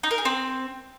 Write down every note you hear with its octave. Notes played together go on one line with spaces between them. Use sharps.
D#4
A#4
G#4
C4